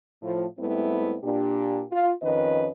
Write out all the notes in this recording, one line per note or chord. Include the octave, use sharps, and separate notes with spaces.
A2 F3
G#2 G3 A3 B3 C4 E4
A#2 D4 G4
F4
F2 D#3 C#4 B4 D#5